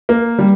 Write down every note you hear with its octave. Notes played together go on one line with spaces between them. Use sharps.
A#3
G3